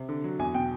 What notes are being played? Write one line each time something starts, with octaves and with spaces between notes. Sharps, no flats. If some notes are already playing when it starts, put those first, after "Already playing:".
Already playing: C3
D3
F#3
E2 G#5
B2 G5